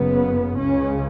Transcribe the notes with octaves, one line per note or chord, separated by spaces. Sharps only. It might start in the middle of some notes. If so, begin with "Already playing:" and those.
Already playing: F#1 F#2 C#3 B3
C#2 C#3 C#4